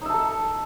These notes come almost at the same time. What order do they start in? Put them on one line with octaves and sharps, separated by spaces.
D#4 E5 A5 A4